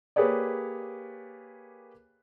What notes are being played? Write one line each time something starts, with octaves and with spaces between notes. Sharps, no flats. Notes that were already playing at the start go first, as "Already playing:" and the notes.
A#3 G4 G#4 B4 C#5 D5